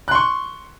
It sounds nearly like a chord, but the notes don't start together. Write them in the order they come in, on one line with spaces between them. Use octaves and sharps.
F#6 C6 C#6